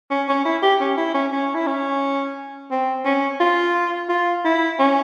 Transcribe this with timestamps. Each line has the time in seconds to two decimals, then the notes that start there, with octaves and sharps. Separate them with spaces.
0.10 C#4
0.28 C#4
0.45 E4
0.62 G4
0.81 C#4
0.97 E4
1.14 C#4
1.32 C#4
1.54 E4
1.67 C#4
2.71 C4
3.05 C#4
3.40 F4
4.09 F4
4.45 E4
4.79 C#4